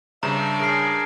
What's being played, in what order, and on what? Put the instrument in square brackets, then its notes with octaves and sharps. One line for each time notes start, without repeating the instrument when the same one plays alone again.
[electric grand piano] G2 C#3 [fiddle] D4 D5 [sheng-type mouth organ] E5 [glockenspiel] A#5
[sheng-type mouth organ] G#4 A#4 G#5 [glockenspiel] C7 D7